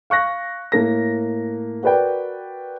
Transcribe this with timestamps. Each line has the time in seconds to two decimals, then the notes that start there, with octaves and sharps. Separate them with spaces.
0.10 F5 C#6 F#6 A#6
0.72 A2 A#3 A#6
1.83 F#4 A#4 B4 D5 G5